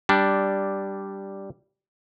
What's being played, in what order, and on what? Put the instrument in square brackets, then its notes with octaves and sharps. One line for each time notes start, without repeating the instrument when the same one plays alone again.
[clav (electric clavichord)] G3 D4